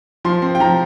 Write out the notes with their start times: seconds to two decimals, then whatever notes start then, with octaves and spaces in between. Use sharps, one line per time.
0.25 F3 C6
0.42 C4
0.55 G5
0.60 F3 A#5